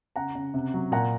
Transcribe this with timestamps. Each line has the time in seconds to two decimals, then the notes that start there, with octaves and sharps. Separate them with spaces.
0.16 C#3 F#5 A#5
0.35 C#3
0.54 C3
0.74 F#3
0.92 A#2 F#5 A#5